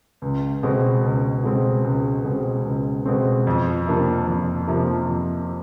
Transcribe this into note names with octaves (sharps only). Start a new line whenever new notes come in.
C#2
B2 G#3 C4
C#2
B2 G#3 C4
C#2
B2 G#3 C4
C#2
B2 G#3 C4
F2
C3 F3 A#3 D4
F2
C3 F3 A#3 D4
F2